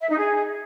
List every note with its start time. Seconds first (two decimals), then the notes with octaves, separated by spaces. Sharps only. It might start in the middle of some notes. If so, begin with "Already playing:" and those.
0.01 E5
0.10 D#4
0.18 G#4